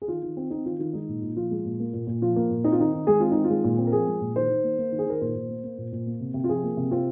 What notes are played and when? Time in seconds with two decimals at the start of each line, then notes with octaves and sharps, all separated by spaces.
0.02 G#4
0.08 D#3 F4
0.22 D#3
0.37 C4
0.50 C4 D#4
0.65 D#3 F4
0.79 D#3 F4
0.93 G#3 D#4
1.08 A#2
1.22 A#2
1.36 F3 F4
1.51 G#3
1.65 A#2
1.80 A#3
1.93 A#2
2.07 A#2
2.22 F3 F4
2.36 A#3
2.50 A#2
2.64 C4 D#4
2.72 F4
2.79 D#3 D#4
2.94 D#3
3.07 G#3 G#4
3.20 C4 F4
3.32 D#3 D#4
3.44 F4
3.50 G#3
3.64 A#2
3.78 C4
3.87 A#4
3.92 F3 G#4
4.07 G#3
4.21 A#2
4.36 D#3 C5
4.50 D#3
4.64 A#3
4.78 A#3
4.92 D#3
4.99 G#4
5.06 D#3 A#4
5.21 A#2 C5
5.35 A#2
5.49 A#3
5.64 A#3
5.78 A#2
5.92 A#2
6.06 A#3
6.21 C3
6.34 C3
6.44 F4
6.49 F3 G#4
6.63 A#3
6.77 C3
6.91 C4 F4